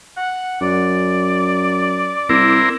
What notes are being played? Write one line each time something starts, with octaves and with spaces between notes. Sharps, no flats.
F#5
F#2 D5
C2 C4 E4 A#4